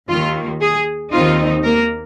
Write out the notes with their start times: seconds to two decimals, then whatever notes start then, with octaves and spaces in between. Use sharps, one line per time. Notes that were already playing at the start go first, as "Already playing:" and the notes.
0.09 D#2 D#3 A#3 F4
0.61 G#4
1.12 D#2 D#3 C4 D#4 F4
1.63 A#3 A#4